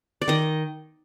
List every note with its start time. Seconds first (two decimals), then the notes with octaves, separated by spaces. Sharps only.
0.22 D5
0.28 D#3 D#5